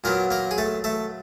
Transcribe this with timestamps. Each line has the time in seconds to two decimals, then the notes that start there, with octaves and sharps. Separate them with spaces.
0.04 A#2 F#3 A#3 B3 A#4
0.31 A#3 A#4
0.51 G#4
0.58 A3 A4
0.84 A3 A4